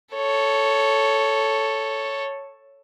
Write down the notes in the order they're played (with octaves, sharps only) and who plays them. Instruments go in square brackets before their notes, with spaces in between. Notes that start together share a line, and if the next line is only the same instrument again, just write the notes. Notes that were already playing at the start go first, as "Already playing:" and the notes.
[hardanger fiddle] A4 C#5